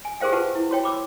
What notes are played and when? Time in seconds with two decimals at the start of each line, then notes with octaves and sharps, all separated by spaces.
0.05 G#5
0.20 G4 G#4 A#4 C5 F5 G5
0.32 F4 G4 B4 F#5 A5
0.55 E4
0.71 F#4 C#5 G5
0.83 B5 D6 E6